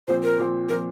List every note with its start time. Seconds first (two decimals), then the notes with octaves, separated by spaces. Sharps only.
0.08 A#2 F3 C4 C5
0.23 A#4
0.38 A#2 F3 C4
0.69 A#2 F3 C4 A#4